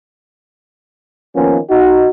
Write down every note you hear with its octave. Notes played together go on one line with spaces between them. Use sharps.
D#3 F3 A#3 B3 C#4
D#4 F#4